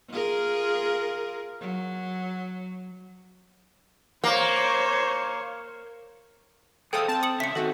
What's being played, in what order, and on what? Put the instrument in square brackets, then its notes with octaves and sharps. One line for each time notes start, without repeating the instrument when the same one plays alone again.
[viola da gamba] F4 G#4 A#4
F#3
[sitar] A#3 [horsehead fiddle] C5 C#5
[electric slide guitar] G#4 C5 F5 [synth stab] A4 D#6 [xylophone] G5
[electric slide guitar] C4 [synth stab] A5
[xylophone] D#6 C#7 F#7
[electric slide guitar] C#3 E5 [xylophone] B6 C#7
[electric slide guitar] D#3 C4 [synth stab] F#4 [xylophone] A4